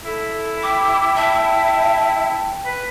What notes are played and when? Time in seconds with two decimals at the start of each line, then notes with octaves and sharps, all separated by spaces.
0.05 E4 A4
0.63 G5 D6
1.15 E5 A5
2.65 B4